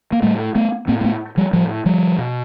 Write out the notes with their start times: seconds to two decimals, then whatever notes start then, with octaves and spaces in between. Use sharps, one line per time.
0.12 A#3
0.22 A2 G3 A3
0.55 A3 B3
0.88 A2 A#3 C4
1.01 A#3
1.04 A3 B3
1.37 F3 G3
1.53 A2 F3 G3
1.86 F3 G3
2.18 B2